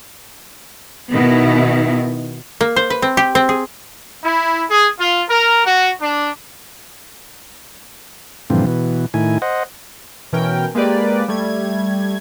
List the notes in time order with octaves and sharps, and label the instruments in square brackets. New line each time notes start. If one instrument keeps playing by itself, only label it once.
[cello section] B2 D#3 B3 E4
[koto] A#3
C5
B4
C4
G4
C4
G#4
[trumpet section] E4
G#4
F4
A#4
F#4
D4
[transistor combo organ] G2 A#2 D3 E3 F3 C4
B2 E3
A2 D#3 E4 G#5
C5 D#5 F#5
[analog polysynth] B2 E3 C#4 A#4 G5
G#3 A#3 G4 B4 D5
G3 A3 G#6